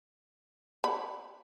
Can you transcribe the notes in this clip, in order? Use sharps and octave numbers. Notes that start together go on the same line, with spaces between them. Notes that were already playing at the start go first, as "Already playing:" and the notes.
B5